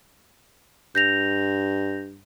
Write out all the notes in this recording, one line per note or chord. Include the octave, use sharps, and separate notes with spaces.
G2 G6 A#6 F7